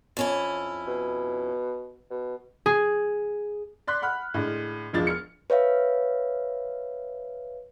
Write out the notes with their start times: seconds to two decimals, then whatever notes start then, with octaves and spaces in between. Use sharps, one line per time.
0.17 F2 C#4 E4
0.88 B2
2.11 B2
2.66 G#4
3.87 D5 C6 F#6 B6
4.02 F#5 B5 F6 F#6
4.34 A2 D3 G#3 D4
4.93 E1 F3 G#3 D4 F4 A6
5.07 F6 C#7
5.50 B4 C#5 E5 F5